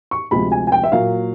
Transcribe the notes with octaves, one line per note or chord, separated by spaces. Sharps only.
C#6
D2 C3 F3 G#3 B5
G#5
G#5
G5
E5
A#2 F#3 A#3 F5